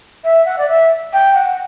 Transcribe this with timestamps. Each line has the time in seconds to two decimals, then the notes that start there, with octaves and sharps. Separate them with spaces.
0.24 E5
0.45 F#5
0.58 D5
0.68 E5
1.13 G5
1.34 F#5